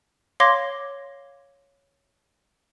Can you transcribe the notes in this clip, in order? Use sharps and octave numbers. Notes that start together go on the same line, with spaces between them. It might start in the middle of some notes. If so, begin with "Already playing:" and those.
C#5 F5 C6 D6 G#6 A#6